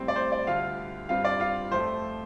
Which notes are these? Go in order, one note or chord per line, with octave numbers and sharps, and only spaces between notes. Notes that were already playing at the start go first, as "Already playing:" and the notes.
Already playing: A2 G3 C4
D5
C5
D5
D2 D3 G3 F4 F5
G2 G3 C4 F4 F5
D5
F4 F5
F2 F3 A3 C5